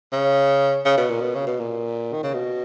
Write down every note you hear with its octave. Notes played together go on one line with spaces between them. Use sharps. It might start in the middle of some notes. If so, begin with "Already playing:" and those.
C#3
C#3
B2
A#2
B2
C#3
B2
A#2
D#3
C#3
B2